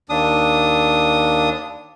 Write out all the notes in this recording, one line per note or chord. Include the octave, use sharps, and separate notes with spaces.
D#2 D4 D#6